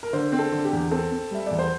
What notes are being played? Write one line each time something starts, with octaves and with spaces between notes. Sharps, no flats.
A#4
D3 C5
C4
A4
D3
G4
E2
C4 A4
C4
G3 E5
E2 D5
C5